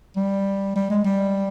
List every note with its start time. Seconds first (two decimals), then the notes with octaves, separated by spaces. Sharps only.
0.16 G3
0.76 G3
0.90 G#3
1.04 G3